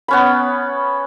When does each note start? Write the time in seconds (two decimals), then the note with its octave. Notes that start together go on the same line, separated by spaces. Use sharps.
0.08 B3 C#4 B5